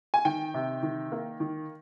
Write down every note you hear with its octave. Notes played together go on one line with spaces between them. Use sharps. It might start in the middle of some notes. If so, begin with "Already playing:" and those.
G#5
D#3 G5
C3
D#3
A#3
D#3